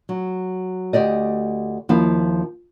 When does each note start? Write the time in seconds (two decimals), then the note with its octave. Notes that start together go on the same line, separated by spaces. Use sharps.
0.09 F#3
0.93 D2 G4 D5 D#5
1.89 D#2 F3 E4 F5